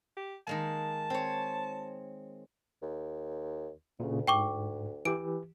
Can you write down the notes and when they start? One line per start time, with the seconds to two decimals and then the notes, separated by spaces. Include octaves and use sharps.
0.17 G4
0.47 D#3 G#3 A#3 A5
1.10 C4 C#5
2.82 D#2
4.00 D2 A#2 C#3
4.27 G#2 G5 C#6 D6
5.05 E3 G4 D7